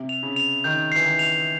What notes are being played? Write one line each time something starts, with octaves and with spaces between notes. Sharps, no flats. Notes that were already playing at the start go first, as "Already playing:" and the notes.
Already playing: C3
F7
C#3
F7
D#3 G6
E3 C7
D#3
F7